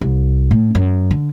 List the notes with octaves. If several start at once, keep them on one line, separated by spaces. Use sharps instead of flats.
C2
A2
F#2
D3